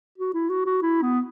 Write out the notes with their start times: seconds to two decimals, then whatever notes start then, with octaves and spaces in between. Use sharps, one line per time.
0.18 F#4
0.34 E4
0.49 F#4
0.66 F#4
0.82 E4
1.02 B3